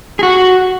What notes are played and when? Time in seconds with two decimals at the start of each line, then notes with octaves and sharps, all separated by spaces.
0.19 G#4
0.23 F#4